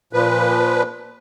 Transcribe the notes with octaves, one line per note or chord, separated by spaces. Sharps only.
A#2 F3 B4